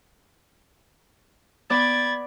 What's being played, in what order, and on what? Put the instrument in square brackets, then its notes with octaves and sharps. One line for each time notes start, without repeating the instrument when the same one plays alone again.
[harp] B3 D5 [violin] B5 G#6 [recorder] A6